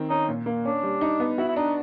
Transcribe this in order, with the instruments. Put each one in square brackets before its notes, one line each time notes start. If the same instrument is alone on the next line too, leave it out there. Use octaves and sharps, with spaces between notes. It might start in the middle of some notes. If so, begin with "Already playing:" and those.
Already playing: [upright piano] D#3 C4
[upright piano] C#4 [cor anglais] D#4
[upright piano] A#2
A#3
[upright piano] C#4 [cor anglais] D4
[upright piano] G3
D#4
B3
[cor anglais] E4 [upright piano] F#4
[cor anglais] E4
[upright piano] D4 [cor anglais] D#4